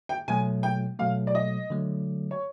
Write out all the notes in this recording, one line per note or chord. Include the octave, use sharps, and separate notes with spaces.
G5
B2 F#3 A3 G#5
G5
B2 F#3 A3 F5
D5
D#5
D3 F#3 A3
C#5